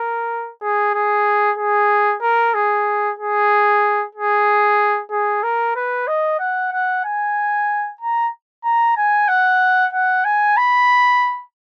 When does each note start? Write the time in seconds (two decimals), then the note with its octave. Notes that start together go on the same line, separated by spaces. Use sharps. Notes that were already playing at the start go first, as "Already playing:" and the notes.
Already playing: A#4
0.62 G#4
0.94 G#4
1.58 G#4
2.22 A#4
2.54 G#4
3.19 G#4
4.15 G#4
5.11 G#4
5.43 A#4
5.76 B4
6.07 D#5
6.39 F#5
6.72 F#5
7.04 G#5
8.01 A#5
8.64 A#5
8.97 G#5
9.28 F#5
9.93 F#5
10.24 G#5
10.57 B5